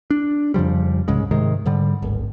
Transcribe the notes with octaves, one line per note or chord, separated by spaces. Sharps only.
D4
F2 C#3 F3 G3
C2 G#2 C#3 G#3
G#2 C3 D#3 G#3
G#2 D3 G3
D1 G#1